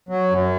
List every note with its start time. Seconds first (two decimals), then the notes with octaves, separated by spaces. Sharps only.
0.09 F#3
0.30 F#2